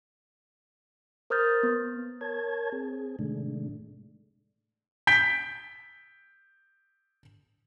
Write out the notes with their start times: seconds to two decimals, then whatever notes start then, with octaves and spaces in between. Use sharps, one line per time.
1.30 A#4 C5 D#6 F6 G6 A6
1.63 B3
2.21 A#4 C#5 A5 G#6
2.72 C4 G#4
3.19 A2 C3 D#3 G#3 A3 D4
5.07 G6 B6 D7 G7